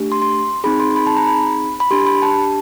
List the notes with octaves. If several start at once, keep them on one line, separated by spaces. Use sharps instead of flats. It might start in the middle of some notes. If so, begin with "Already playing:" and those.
Already playing: A3 D4 G4
C6
C6
C4 D#4 G#4 B5
C6
B5
A5
A#5
B5
B5
D4 G4 C6
B5
A5